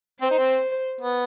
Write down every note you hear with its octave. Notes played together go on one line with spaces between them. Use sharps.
C4 C5
D#4
C4
B3